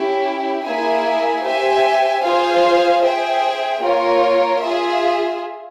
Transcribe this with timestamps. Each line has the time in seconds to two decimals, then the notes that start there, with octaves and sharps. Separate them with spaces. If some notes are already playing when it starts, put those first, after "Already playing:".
Already playing: C#4 E4 G4
0.64 A#3 E4 G#4 E5 G#5
1.43 G4 C5 E5 G#5
2.23 F4 G#4 C5 F5 G#5
3.02 G#4 C5 E5 G5
3.82 A#3 F4 A#4 C#5
4.62 F4 G#4 E5